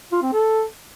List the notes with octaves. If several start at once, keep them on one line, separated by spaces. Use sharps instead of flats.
F4
C4
A4